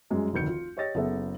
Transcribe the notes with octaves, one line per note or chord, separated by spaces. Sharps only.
F#2 G3 G#3
F1 D2 D#3 G6 C#7
F4
G4 C#5 D#5 A6 A#6
F#1 B3 G#4 A4 E5